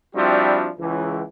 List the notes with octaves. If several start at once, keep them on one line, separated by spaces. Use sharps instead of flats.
F3 G3 C4 D4 E4 F#4
C#2 E3